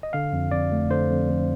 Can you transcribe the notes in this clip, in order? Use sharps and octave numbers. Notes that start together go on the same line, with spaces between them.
D#5
D3 F5
F2
F2 D5
A3
D3 C5
F2
F2